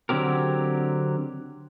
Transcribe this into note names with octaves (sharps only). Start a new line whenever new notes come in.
D3 F#3 C4 G4 A#4